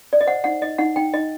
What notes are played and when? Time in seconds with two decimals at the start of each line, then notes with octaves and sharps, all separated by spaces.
0.13 D5
0.21 D#5
0.27 C5 F#5
0.44 D#4 F#5
0.62 D#4 D#5
0.78 D#4 F#5
0.96 D#4 G5
1.14 D#4 D#5